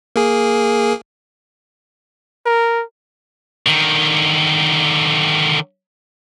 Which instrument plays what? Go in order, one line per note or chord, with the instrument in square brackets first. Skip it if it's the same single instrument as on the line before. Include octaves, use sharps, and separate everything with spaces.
[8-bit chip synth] A#3 G#4
[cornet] A#4
[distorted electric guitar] D3 D#3